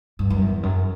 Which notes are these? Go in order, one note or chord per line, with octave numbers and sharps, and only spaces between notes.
G2
F#2
E2
F#2